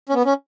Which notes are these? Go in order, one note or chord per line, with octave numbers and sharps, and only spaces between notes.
C#4
B3
C#4